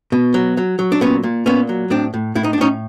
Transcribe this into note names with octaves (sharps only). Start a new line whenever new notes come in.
B2
F#3
F#3
F#3
D4
A#2 B3 C#4
A#2
A#2 B3 C#4
F#3
A2 C4 D4
A2
A2 E4
D#4
D4
A2 C#4 D#4